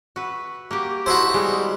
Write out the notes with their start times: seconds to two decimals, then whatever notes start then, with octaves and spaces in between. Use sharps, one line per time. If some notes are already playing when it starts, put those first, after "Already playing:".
0.16 F#4 B4 E5
0.71 A#3 F#4 G4
1.06 D#4 E4 F#4 A4 C5
1.34 G3 G#3 B3